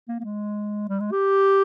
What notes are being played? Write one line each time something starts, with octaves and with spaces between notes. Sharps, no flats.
A#3
A#3
G#3
G3
G#3
G4